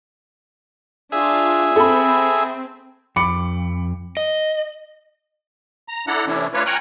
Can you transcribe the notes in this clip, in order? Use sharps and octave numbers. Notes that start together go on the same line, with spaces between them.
D4 F4 G#4 E5
C4 A4 B5
F2 B5 D6 C#7
D#5
A#5
D4 E4 A4 F#5 A#5
C3 E3 A3 C#4 D4 E4
A3 D4 F4 B4 C#5
G5 G#5 A#5 C#6 F6 F#6